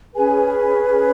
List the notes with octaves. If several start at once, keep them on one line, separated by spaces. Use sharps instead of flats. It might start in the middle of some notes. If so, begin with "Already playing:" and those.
C#4 G#4 B4 G#5
G#5